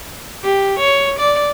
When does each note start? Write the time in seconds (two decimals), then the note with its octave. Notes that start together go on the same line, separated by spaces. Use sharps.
0.43 G4
0.79 C#5
1.19 D5